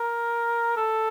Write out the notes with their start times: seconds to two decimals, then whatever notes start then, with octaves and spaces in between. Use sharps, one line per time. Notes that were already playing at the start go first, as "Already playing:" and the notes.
Already playing: A#4
0.77 A4